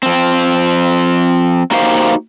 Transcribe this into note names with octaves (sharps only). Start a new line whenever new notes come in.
F3 C4
A#3 D#4 F#4 G4 C5 F5